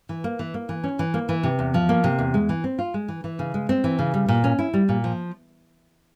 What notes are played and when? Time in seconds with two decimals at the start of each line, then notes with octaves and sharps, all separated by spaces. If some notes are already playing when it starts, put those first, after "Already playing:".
0.09 E3
0.24 A#3
0.39 E3
0.54 A#3
0.69 E3
0.84 C#4
0.99 E3
1.14 A#3
1.29 E3
1.44 C3
1.59 E2
1.74 F3
1.89 A#3
2.04 C3
2.19 E2
2.34 G#3
2.49 E3
2.64 C4
2.79 F4
2.94 G#3
3.08 E3
3.24 E3
3.39 C#3
3.54 G#3
3.69 C4
3.84 E3
3.99 C#3
4.14 G3
4.29 A#2
4.44 C#4
4.59 E4
4.74 G3
4.89 A#2
5.04 F3